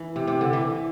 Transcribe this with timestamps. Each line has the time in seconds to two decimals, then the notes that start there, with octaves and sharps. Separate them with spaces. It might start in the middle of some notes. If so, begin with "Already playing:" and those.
Already playing: E3
0.16 C3
0.27 C3
0.41 D3
0.53 E3